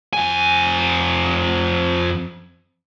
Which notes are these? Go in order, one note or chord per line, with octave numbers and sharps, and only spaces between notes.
F2 G#5